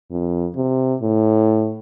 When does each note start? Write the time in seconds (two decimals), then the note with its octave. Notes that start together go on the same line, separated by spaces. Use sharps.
0.11 F2
0.56 C3
1.02 A2